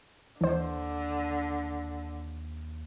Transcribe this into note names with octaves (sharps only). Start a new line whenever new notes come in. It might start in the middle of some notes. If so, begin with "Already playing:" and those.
D#2 D3 E3 C5